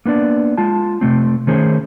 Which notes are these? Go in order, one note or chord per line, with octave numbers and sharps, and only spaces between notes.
A#3 B3 D4 D5
G#3 F4 A5
C3 A3 C4
D#3 A3 C#4 G#4 C5